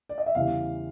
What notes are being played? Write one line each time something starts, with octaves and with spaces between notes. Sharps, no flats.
D5
D#5
E5
E2 C#3 E3 G3 F5